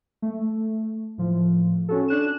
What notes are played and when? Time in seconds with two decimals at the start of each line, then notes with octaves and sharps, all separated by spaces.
0.22 A3
1.18 A2 F3
1.89 C#4 F#4 A4
2.08 D4 F#6 E7